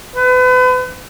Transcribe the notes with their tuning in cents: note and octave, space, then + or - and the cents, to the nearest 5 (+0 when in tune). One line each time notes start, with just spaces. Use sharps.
B4 +35